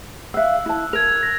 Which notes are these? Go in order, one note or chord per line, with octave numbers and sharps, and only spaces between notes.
E5 F5 E6 F#6
E4 A5
A#4 G#6 F7
A#6